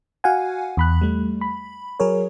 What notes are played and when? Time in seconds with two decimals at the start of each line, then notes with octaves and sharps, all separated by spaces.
0.24 F#4 F5 F#5 G#5
0.77 E2 B5 F#6
1.01 G3 A3
1.41 B5
2.00 F#3 G#4 A#4 C#5